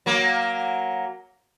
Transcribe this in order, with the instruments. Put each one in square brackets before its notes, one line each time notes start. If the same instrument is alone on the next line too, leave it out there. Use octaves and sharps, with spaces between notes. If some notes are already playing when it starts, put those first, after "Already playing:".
[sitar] F#3 A#3